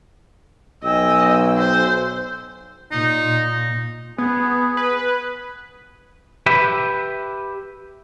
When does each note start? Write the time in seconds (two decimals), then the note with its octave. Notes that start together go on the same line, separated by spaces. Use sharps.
0.84 B1 D#5 G5 G#5 E6
1.57 C5
2.91 A#2 D#4
4.18 B3 G#4
4.77 B4
6.46 G4 B4 E5